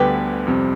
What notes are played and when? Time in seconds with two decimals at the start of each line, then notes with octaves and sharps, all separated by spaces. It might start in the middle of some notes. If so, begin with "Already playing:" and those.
Already playing: D2 D3 G3 B3 G4 B4
0.47 F2 C3 G3 C4